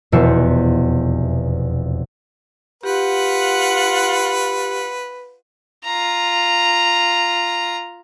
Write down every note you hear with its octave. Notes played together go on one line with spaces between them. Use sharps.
F1 E2 B2 C5 E5 C#7
F4 G4 B4 F#5
F4 A#5